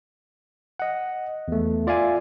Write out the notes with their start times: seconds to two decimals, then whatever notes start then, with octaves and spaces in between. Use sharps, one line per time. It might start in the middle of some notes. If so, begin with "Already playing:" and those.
0.80 D#5 F#5
1.48 E2 A3
1.87 F4 D5 E5 F5 G#5